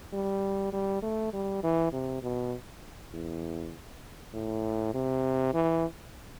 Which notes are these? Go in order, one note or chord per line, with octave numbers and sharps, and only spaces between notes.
G3
G3
A3
G3
E3
C3
B2
E2
A2
C3
E3